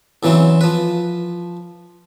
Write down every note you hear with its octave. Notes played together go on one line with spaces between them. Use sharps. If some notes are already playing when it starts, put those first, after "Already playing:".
E2 C#3 E3 F#3 C4
F3 B4